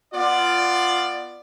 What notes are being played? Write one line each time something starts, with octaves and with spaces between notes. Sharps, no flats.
B3 F4 D5